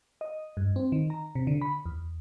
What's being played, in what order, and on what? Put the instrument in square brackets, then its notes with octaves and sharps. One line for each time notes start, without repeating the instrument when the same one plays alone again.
[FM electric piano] D#5
G2
C4
D#3
A#5
C3
D3
B5
E2